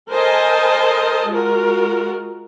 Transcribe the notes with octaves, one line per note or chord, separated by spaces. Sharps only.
A4 A#4 C5 D#5 G#5 A5
G#3 F4 F#4 A#4